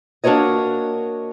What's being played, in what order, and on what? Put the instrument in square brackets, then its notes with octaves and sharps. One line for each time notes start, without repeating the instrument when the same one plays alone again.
[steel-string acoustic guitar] A#3 D4 F#4 A#4 C#5 D#5